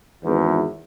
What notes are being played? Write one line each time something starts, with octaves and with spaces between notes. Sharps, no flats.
G#1 E2 E3